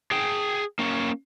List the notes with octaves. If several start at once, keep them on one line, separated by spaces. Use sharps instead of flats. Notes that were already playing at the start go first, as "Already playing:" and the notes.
G#4 G5
A#3 C#4